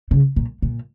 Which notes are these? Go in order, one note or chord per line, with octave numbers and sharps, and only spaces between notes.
C#3
A#2
A#2